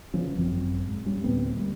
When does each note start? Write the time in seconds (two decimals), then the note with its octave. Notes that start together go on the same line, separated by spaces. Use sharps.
0.14 C#3 E3 F3 C#4
0.36 G#1 F#2 C4
0.87 G#2
1.06 G3 C#4
1.24 D2 A2 B3 C4
1.55 G3 A3 A#3